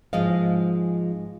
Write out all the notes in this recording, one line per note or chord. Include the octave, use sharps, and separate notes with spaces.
G#2 F3 G#3 D#5 F5